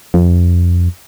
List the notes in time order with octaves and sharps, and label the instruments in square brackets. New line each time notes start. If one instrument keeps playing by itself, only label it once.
[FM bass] F2